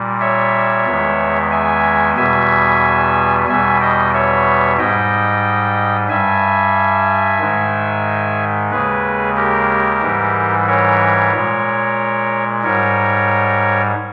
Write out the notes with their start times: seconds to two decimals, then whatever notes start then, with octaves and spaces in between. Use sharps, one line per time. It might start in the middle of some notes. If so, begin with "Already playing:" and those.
Already playing: A#2 G3
0.20 C#5 E5
0.86 E2 D#3 G#3
1.51 E5 G#5
2.17 E2 B2 G3 E5 G#5
3.48 E2 B2 G3 E5 G#5
3.80 D#5 G5
4.13 C#5 E5
4.78 G#2 G3 D#5 G5
6.09 G2 G3 E5 G#5
7.40 G#2 D#3 G#3
8.71 D#2 C#3 G#3 G#4 B4
9.36 G4 A#4
10.02 G#2 E3 G3
10.67 A#4 C#5
11.33 A#2 G#3
12.63 G#2 G3 A#4 C#5